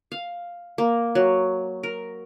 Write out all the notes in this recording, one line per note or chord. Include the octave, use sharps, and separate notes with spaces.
F5
A#3
F#3
A#4